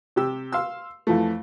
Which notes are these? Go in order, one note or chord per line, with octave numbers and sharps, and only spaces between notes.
C3 G4 E6
F5 C6 E6
F2 E3 F3 A3